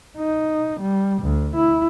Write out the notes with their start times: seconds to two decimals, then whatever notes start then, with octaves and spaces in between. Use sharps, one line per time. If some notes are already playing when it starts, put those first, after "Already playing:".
0.17 D#4
0.81 G3
1.23 D2
1.56 E4